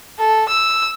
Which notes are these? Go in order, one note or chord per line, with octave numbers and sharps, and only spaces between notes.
A4
E6